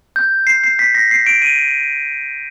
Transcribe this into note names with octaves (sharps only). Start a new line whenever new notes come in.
G6
C7
C7
B6
A#6
C7
D7
D#7